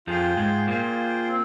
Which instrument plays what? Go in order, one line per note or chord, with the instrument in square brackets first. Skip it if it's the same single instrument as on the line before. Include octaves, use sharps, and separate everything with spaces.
[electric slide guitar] F2 F3 [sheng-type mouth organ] F4 G#4 C5 G5
[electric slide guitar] G#2 G#3
[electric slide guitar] A#2 A#3 [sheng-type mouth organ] F4 G#4 C5 G5
[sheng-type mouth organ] C4